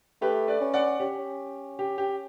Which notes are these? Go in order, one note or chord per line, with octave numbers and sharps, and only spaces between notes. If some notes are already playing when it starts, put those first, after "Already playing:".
A3 G4 B4
B4 D5
C#4
D5 F#5
C#4 G4
C#4
G4
G4